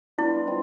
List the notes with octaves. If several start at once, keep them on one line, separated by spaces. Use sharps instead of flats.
G3 B3 D4 E4 F4
G3 C4 F4